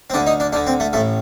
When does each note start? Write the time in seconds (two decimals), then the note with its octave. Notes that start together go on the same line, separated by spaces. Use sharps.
0.10 C4
0.14 D2 D3 D4
0.26 D#4
0.40 D4
0.53 D2 D3 D4
0.67 C4
0.80 A3
0.93 A1 A3
0.96 A2